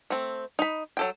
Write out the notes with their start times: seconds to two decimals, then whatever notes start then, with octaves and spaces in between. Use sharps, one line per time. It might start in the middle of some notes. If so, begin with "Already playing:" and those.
0.10 A3 C4
0.59 D#4 B5
0.97 F#3 A4 G5